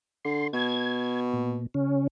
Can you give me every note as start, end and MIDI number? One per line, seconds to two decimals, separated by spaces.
0.25 0.47 50
0.25 0.47 84
0.53 1.60 47
0.53 1.20 92
1.33 1.67 46
1.74 2.07 49
1.74 2.07 61